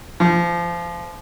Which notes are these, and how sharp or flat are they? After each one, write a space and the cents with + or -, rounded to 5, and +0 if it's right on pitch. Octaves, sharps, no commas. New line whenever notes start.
F3 -25